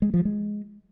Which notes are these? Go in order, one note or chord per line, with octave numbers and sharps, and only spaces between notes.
G#3
F3
G#3